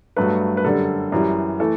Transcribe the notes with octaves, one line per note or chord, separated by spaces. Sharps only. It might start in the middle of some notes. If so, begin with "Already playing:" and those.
G2 F#3 A3 B4
B4
F#2 D3 G3 A4
F#2 E3 G3
E3 A3 A4